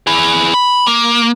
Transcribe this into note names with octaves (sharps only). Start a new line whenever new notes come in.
E4 G#4
B5
A#3